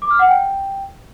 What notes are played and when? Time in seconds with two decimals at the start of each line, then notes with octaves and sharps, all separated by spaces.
0.02 D6
0.11 F6
0.19 F#5
0.28 G5